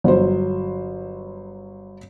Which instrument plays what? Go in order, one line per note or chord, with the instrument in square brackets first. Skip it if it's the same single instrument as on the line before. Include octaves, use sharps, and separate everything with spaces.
[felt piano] G1 F#3 C5